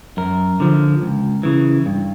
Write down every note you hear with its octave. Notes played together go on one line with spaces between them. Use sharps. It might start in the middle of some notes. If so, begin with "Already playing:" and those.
F#2 A#4
D3 F3
C#2
C#3 E3
G2